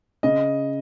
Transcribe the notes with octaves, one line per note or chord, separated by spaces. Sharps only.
C#3 D#5